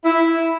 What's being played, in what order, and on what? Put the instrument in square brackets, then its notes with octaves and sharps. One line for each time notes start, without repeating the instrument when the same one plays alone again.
[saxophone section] E4